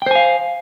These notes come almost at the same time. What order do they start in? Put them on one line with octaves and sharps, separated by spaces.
G5 C5 G#5 F5